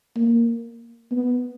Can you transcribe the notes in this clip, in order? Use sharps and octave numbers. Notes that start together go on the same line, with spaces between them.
A#3
B3